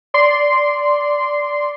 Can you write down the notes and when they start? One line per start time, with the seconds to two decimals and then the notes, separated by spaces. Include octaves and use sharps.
0.14 D5 C6